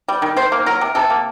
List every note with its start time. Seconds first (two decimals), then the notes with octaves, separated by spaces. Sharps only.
0.08 G3
0.22 D#3
0.36 D#3 C5
0.52 A#3
0.66 F#3 A#4
0.81 C3
0.95 C3 A4
1.10 A#3